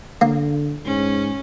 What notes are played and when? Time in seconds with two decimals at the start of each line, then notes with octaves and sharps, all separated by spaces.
0.21 D3 A#3
0.85 G#2 C#4